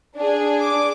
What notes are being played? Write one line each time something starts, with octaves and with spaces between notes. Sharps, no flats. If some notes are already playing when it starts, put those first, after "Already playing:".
D4 G#4
D6